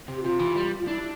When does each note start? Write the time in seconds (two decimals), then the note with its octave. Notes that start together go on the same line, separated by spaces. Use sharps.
0.08 C3
0.16 G4
0.23 C3 F4
0.39 E3
0.56 G3
0.79 F4
0.87 D4 E4